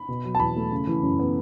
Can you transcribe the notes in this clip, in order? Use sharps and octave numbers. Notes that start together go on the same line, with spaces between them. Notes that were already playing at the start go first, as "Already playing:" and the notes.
Already playing: B5
B2
F#3
A5
E2 B5
A3
C#3
E3
F#2
B3